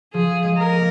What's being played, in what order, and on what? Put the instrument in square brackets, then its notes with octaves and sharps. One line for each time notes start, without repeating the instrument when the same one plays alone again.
[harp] F3 [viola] G#4
[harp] G#3
[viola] A#4
[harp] A#3